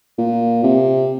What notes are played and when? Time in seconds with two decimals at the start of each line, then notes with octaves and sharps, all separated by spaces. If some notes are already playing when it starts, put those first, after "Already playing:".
0.18 A#2
0.63 C3